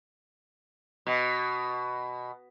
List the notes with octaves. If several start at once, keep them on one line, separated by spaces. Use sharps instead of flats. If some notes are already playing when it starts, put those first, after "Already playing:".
B2